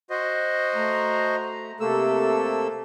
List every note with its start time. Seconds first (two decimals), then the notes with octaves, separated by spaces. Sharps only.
0.10 F#4 C5 D#5
0.75 A3 A#5
1.80 C3 A3 A#3 A4 E6